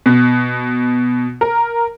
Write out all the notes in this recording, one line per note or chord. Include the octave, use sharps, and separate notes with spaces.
B2
A#4